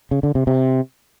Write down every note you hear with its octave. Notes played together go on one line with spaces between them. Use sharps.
C#3
D3
C3
C3